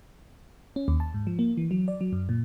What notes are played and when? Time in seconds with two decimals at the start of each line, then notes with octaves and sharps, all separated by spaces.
0.76 C#4
0.88 D#2
1.00 A5
1.14 G#2
1.27 F3
1.39 A#3
1.58 E3
1.71 F#3
1.88 D5
2.01 F#3
2.13 F#2
2.29 A#2